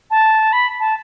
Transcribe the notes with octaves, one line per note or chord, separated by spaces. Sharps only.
A5
B5
A5